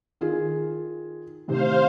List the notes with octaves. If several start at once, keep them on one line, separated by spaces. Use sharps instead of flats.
D#3 F4 G#4
A2 C3 D#3 C5 F5